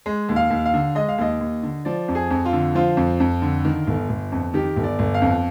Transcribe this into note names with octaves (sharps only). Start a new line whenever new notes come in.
G#3
D#2
F5
D#2
F5
D3
G#3 D#5
F5
D#2 D#5
D#2
D3
F3 D5
F2
G#4
F2
F4
D3
F3 F4
F2
F2
D3
D#3
G1
G1
F2
D#3 G4
G1
D5
G1
F5
F2